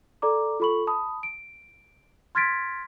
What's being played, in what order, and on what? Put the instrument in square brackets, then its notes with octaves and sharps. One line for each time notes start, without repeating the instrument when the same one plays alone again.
[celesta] A4 D5 A#5 D6
F4 A4 B5 C#6 F#7
A5 B5 D#6
D7
C6 F6 G#6 A6 B6 D7